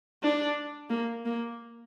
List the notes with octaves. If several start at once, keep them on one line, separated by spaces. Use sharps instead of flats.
D4
A#3
A#3